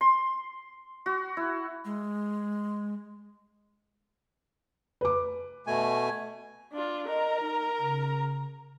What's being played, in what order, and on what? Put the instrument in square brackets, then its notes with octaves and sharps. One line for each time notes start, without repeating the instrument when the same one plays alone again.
[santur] C6
F#4
E4
[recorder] G#3
[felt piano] B4 D6
[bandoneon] B2 A3 G#5
[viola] D4 F4
[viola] A#4 A#5 [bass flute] D#5
[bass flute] D#4
C#3